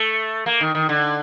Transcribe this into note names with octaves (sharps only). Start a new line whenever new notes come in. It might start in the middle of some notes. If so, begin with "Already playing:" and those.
Already playing: A3
A#3
D#3
D#3
D3